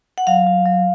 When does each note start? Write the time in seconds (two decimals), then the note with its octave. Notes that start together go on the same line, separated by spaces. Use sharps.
0.18 F#5
0.27 F#3 F5
0.47 F#3
0.66 F#3